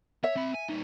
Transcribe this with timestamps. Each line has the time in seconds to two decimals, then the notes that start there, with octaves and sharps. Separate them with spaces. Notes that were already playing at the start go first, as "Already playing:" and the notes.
0.24 C#5 E5
0.36 C4 B5
0.54 G#5
0.69 G3 D#4